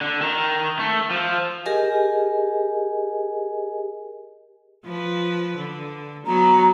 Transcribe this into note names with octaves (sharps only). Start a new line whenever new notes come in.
D3
D#3
A3
F3
G4 G#4 A#4 D#5 G#5
F3 B4
D3
F#3 B3 F#4 A#5